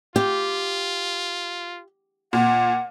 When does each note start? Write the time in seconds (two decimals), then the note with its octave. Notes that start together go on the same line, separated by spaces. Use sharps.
0.16 F4 G4
2.33 A#2 F#5